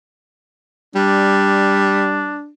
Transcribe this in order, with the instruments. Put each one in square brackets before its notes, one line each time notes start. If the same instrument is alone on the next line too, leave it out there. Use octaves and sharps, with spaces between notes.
[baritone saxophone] G3 [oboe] D4